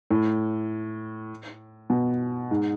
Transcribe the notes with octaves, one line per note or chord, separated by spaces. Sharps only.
A2
B2
G#2